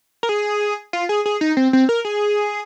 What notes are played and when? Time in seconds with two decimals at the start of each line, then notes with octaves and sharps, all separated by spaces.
0.23 A#4
0.29 G#4
0.93 F4
1.09 G#4
1.26 G#4
1.41 D#4
1.57 C4
1.73 C4
1.89 A#4
2.05 G#4